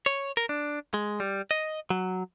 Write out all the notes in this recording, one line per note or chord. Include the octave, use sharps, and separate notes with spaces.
C#5
A#4
D4
G#3
G3
D#5
F#3